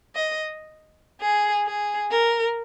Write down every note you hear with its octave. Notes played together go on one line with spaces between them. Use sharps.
D#5
G#4
G#4
A#4